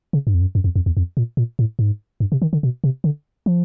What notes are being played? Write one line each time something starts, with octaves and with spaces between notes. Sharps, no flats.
C#3
G2
F2
F#2
F#2
F2
F2
E2
F2
A#2
A#2
A2
G#2
G2
C3
D#3
D3
B2
C3
D3
F3